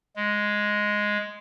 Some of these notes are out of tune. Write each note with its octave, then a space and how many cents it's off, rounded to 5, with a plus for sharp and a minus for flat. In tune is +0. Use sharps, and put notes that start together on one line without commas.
G#3 +0